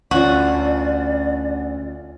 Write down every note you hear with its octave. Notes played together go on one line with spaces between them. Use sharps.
D2 C#4 F4 F#4 D5